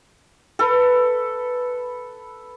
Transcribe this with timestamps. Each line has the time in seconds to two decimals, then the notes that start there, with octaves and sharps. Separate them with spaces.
0.59 A4 B4